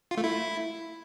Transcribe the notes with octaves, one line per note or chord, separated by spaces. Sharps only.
F4
A3
E4